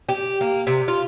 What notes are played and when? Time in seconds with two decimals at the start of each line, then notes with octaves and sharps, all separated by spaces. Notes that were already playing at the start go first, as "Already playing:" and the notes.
0.09 G4
0.41 A#3
0.67 C3
0.88 F4